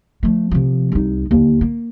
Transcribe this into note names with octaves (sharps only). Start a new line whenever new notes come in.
F3 A3
C3 F3
C2 D#4
D#2 D3
A#3